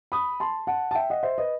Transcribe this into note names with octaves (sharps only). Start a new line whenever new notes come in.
B5 D#6
A5 C6
F#5 A5
A5
E5 G5
D#5 F#5
C5 E5
B4 D#5